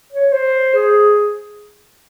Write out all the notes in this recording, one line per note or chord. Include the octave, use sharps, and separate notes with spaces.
C#5
C5
G#4